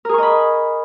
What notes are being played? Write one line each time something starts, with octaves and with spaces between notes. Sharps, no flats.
G#4 A#4 D#5 B5 C#6